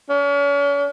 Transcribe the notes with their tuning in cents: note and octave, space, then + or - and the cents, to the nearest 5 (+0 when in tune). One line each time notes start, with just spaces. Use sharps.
C#4 +40